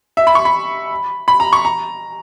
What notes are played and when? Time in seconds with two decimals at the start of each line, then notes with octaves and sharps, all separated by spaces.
0.17 E5
0.27 B5
0.35 C#6
0.45 B5
1.28 B5
1.40 A#5
1.53 C#6
1.65 A#5